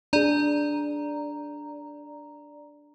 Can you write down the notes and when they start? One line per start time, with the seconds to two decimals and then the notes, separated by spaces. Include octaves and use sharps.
0.13 D4 G#4 D5 A#5